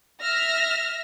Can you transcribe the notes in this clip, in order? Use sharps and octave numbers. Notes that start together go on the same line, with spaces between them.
E5 F6 A#6